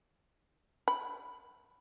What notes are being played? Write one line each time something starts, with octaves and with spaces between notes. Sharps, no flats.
B5